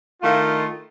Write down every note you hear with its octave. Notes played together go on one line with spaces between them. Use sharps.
D#3 A3 E4 F4